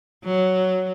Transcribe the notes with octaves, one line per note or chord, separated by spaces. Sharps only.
F#3